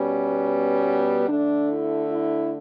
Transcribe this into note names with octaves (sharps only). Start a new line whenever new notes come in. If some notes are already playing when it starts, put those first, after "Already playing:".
Already playing: B2 G3 B3 C#4
D3 A3 D4
E4
E4